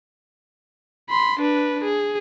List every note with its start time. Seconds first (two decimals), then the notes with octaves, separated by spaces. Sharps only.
1.10 B5 C6
1.40 D4 B4
1.84 G#4